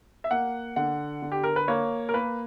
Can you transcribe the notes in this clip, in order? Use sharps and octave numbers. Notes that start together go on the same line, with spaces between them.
E5
A#3 F#5
D3 F#5
D3
G4
A#4
B4
A#3 C#5
A#4
A#3 B4